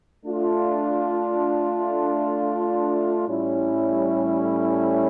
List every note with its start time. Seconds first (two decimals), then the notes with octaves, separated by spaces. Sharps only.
0.25 A3 D4 F4
3.27 A2 G3 C#4 E4